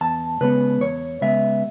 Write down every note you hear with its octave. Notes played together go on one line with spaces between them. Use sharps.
E2 A5
C#3 G#3 B3 B4
E2 C#5
C#3 G#3 B3 E5